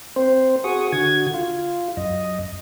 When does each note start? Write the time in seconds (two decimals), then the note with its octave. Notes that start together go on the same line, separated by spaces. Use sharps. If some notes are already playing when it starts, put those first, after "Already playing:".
0.16 C4 C5
0.64 F#4 G#4 C#6 D#6
0.92 D3 F#4 G#6
1.34 F4
1.97 F#2 D#5